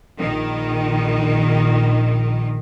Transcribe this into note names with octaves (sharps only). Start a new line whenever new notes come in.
A#1 D#3